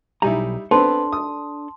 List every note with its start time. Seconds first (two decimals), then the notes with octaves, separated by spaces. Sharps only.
0.22 B1 G3 D#4 E4 G#5 A#5
0.71 B3 C4 D4 A4 B4 A5 C6
1.12 D#6